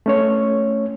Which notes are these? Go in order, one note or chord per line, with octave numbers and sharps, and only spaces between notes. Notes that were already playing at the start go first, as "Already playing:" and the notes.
A3 C#4 C#5